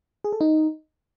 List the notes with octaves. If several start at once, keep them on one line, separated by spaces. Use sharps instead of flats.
G#4
A4
D#4